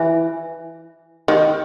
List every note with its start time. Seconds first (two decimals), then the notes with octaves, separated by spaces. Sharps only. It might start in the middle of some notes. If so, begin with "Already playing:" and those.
Already playing: E3
1.28 D#3